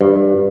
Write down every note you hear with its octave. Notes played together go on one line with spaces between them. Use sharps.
G2